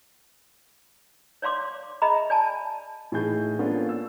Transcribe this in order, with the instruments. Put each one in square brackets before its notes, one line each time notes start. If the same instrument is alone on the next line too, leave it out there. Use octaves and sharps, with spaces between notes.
[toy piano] C#5 D5 F5 C6 D6
G#4 D#5 E5 A#5 B5
D5 G#5 A5
[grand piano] A2 E3 D#4 G#4 G6
A#3 B3 C#4 D4 F4 A4
E6